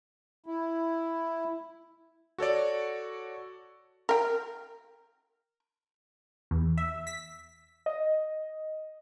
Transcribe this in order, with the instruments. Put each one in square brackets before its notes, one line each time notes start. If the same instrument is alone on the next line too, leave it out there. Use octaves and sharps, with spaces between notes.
[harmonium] E4
[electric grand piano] F#4 A4 C#5 D5
[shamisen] A#4 G5
[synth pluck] E2
E5
B6
[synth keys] D#5